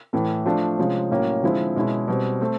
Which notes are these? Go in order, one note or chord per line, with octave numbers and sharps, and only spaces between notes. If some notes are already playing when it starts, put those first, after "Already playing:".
A2 E3 A3
F3 A3 D4
C3 F3 G#3 C#4
A2 F#3 A#3 C#4
D3 F3 G#3 C4 E4
B2 G#3 C#4 E4
B2 G3 C4
A3 C4